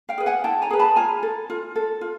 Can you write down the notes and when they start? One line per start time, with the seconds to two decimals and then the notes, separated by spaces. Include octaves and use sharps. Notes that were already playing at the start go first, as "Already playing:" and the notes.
0.09 F5 G5
0.18 G#4 B4
0.26 F#5 G#5
0.44 E4 G5 A5
0.62 G#5 A#5
0.71 G#4 B4
0.79 A5 B5
0.96 F4 G#5 A#5
1.23 A4
1.50 F4
1.76 A4
2.01 F4